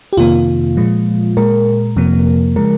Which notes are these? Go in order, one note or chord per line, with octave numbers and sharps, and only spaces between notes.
G4
F2 C3 D#3 A#3 F4
A#2 F3 G#3
A#2 G#3 A#4
F2 C3 F3 A#3
C#3 F3 G#3 A#4